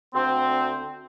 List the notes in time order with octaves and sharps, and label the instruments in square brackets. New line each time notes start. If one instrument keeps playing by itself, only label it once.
[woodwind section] D2 C4